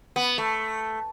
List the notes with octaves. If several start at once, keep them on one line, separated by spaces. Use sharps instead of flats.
B3
A3